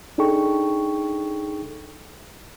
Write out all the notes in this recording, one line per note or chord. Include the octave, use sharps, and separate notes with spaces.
D4 D#4 G#4 A4 G5 C#6